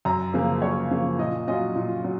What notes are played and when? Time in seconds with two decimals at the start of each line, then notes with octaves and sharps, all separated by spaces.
0.05 F#2 A#5
0.33 C#3 F3 A#3
0.62 F#2 C#5
0.91 C#3 F3 A#3
1.19 A#2 D#5
1.48 F#3 C#4 F4 D#5
1.75 A#2
2.04 F#3